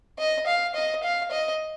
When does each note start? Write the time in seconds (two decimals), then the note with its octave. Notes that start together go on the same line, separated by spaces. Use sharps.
0.19 D#5
0.47 F5
0.75 D#5
1.03 F5
1.31 D#5